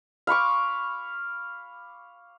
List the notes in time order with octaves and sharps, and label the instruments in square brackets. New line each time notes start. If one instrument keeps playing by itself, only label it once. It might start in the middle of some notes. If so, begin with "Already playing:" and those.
[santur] F5 B5 C#6 D6